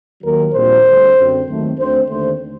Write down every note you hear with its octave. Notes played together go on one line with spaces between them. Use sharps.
D#2 D#3 F#3 A#3 A#4
A#1 A#2 G3 C4 C5
D2 D3 G3
F#2 D3 F#3 C4
D#2 D#3 F#3 A3 C4
D2 D3 A3 C4 C5
D#2 D3 A3 C5